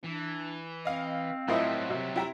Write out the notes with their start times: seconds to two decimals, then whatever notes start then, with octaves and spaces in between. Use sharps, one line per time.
0.04 E3 D4
0.85 C4 D#5 F5
1.48 A2 F#3 G3 E4 F4 A#4 C5 D#5
1.90 C3
2.16 E4 G4 E5 A#5